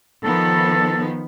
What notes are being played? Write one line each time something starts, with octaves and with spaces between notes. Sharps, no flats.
D#3 F3 B3 A4